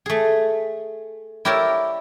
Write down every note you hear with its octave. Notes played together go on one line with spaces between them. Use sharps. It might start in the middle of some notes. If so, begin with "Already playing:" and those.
A3 G#4
E4 G4 A#4 C#5 D5